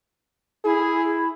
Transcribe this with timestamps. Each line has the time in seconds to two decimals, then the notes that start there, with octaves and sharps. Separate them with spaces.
0.64 E4 G#4